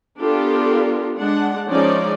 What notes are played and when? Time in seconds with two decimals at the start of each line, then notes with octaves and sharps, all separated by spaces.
0.20 B3 D4 F4 G4 A4 A#4
1.16 G#3 D4 F#5
1.69 F3 G#3 C#4 D#4 D5